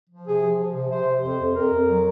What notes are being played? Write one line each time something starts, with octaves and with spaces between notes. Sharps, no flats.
F3
C3 G#4
F3
F3
C3
C3 C5
C3
F2 C5
F2
F2 A#4
F2
F#3